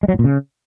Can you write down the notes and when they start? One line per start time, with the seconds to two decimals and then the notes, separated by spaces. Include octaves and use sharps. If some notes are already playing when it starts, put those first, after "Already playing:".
0.03 G#3
0.08 F#3
0.14 A2
0.19 A#2
0.24 C#3